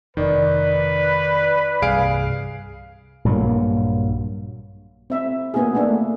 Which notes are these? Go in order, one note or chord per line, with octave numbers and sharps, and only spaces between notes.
F1 D#3 B4 D5
C2 G2 C3 G#4 F5 D7
A#1 G2 F#3 A#3
C4 E5
A#3 B3 D#4 F#4 G#4
A3 A#3 D4 E5